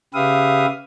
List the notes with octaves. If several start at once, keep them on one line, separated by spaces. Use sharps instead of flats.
C#3 G4 B4 E5 F5 D#6